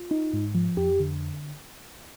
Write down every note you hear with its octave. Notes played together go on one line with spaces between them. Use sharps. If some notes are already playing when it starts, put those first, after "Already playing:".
Already playing: F4
D#4
G#2
F3
F2 G4
D3